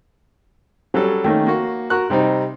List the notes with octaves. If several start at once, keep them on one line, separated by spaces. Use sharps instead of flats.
F#3 G3 C#4 A4
D#3 A3 A#3 C#4
A#3 F#4
F#4 A#4 F#6
C3 G3 C4 D#4